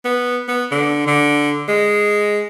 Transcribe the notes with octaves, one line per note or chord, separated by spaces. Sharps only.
B3
B3
D3
D3
G#3